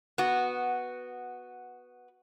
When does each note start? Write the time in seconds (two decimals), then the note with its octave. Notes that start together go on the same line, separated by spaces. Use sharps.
0.18 B3 F#4